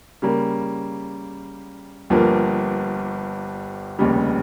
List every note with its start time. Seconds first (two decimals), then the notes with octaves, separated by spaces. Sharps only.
0.22 C#3 G3 A#3
2.10 G1 G2 F3 A#3
3.99 F1 D#2 C#3 G3